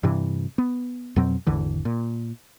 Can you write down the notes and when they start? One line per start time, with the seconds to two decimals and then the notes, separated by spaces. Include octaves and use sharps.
0.03 G2 C3 E3
0.58 B3
1.16 F2 B2 F#3 C4
1.47 G#1 E2 D3 E3
1.85 A#2